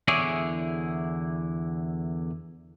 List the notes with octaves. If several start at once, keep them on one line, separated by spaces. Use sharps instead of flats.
E2 D3 E4 G#4 C#5 D5